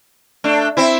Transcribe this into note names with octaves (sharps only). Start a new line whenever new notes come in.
A3 D4
C4 E4